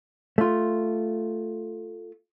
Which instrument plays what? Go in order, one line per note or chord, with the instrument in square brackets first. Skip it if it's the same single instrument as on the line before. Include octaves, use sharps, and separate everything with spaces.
[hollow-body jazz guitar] A3 F4